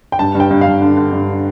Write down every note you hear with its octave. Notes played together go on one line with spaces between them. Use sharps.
G5
G2 A5
G2 G5
G2
F5
G2
D3
D3
G2